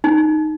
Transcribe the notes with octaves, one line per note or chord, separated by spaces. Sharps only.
D#4